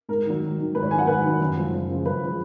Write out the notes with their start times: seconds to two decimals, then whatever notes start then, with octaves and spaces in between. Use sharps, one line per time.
0.09 G#2 A#4
0.25 D#3 F#3
0.42 G#2
0.59 D#3 F#3
0.75 G#2 B4
0.83 C#5
0.91 D#3 G#5
0.95 F#3 F#5
1.07 G#2 B4
1.24 D#3 F#3
1.40 F#2
1.57 C#3 F3 G#3
1.73 F#2
1.89 C#3 F3 G#3
2.06 F#2 B4
2.22 C#3 F3 G#3